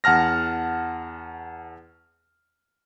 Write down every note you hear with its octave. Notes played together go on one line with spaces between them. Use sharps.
E2 F#5 A5 F6 A#6